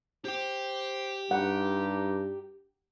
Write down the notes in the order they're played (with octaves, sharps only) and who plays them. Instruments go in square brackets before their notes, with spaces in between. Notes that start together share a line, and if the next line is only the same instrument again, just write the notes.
[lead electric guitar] G4 G5 [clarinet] C5
[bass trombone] G2 [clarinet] D#4 [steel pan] F#5